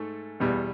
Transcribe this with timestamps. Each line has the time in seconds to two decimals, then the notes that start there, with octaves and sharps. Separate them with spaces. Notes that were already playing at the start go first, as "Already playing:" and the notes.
Already playing: G#2 A3
0.40 E2 B2 G3